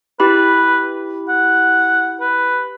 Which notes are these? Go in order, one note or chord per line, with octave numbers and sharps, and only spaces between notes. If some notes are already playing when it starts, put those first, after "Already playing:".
E4 G4 B4 B5
F#5
B4